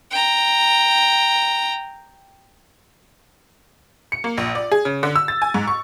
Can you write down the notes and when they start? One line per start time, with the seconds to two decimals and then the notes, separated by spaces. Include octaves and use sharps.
0.11 G5 A#5
4.12 C#7
4.24 A#3
4.38 A#1
4.55 D5
4.72 G#4
4.85 C#3
5.03 D3
5.16 E6
5.28 A6
5.42 G#5
5.54 G#2
5.67 C#6